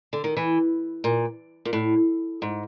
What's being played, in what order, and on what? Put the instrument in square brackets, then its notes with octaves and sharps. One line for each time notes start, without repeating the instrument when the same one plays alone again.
[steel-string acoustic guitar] D3
D#3
E3
A#2
A#2
A2
G#2